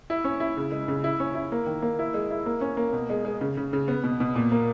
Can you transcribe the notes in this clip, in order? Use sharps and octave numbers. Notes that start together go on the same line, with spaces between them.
E4
C#4
E4
C#3
G#3
C#3
E4
C#4
E4
A#3
D#3
A#3
E4
G#3
E4
A#3
C#4
A#3
B2
G#3
G#3
C#3
C#3
C#3
B3
B2
B2
A#2
A#3